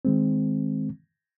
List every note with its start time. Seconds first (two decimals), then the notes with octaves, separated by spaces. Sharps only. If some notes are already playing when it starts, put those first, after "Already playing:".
0.05 D#3 G#3 C4